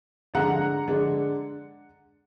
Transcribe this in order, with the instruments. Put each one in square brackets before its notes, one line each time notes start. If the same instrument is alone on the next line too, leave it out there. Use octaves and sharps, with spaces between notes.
[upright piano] D3 G#3 D4 F#5 A#5
D3 G#3 D4